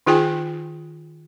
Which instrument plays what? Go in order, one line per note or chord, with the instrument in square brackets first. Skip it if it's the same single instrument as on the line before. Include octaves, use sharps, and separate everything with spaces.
[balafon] D#3 D#4 F4 G#4 G5 G#5